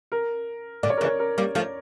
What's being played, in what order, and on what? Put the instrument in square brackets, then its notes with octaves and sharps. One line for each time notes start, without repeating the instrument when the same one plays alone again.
[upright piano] A#4
[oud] A#2 D3 [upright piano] D5
[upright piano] C#5
A#4
[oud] C#3 E3
[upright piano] C#5
A#4
[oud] G3 A#3
F3 A3